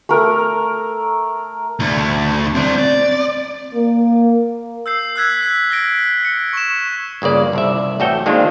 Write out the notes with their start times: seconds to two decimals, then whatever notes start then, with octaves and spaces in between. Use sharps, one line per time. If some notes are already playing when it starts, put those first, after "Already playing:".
0.09 A3 A#4
1.80 D2 D3
2.55 C4 D5
2.78 D5
3.75 A#3
4.86 E6 G6 C7
5.16 E6 F#6 G#6 B6
5.41 F#6 B6
5.70 F6 A#6 D7
6.25 C#7
6.53 C#6 E7
7.22 G1 C#3 A#3 D5
7.53 C2 D5 E5
8.00 A1 A3 F#4 A4 C#5 G5
8.26 D#3 G#3 A#3 C4 D4 F4